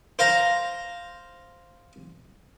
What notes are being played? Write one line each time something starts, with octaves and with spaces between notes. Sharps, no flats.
C5 F5 A#5